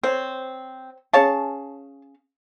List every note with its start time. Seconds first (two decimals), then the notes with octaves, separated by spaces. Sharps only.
0.03 C4 C5 C#5
1.13 C#4 G#4 C#5 F5 A5